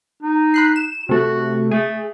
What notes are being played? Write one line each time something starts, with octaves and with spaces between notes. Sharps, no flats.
D#4
B5 F#6 C7
E7
C3 A3 F#4
A3 G#4